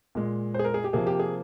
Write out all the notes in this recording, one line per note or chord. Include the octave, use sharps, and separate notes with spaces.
A#2 G#3
G#4 C5
A#4
G#4
G4
C3 F3 A#3 G#4
G4
G#4